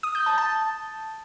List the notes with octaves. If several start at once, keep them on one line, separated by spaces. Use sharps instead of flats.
D#6
G6
A5
A5